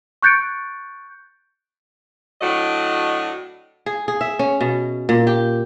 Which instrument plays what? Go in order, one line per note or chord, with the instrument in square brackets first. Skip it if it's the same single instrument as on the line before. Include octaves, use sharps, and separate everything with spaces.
[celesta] C#6 F#6 G6 A6 C#7 D7
[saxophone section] A2 F#3 D4 F#4 D#5
[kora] G#4
G#4
E5
C#4
B2
A#2
G4